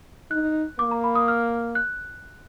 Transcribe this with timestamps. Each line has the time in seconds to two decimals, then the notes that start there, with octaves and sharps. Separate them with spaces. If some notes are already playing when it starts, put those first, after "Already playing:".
0.31 D#4 F#6
0.79 A#3 D6
0.91 A#5
1.04 B5
1.15 D#6
1.28 F6
1.75 F#6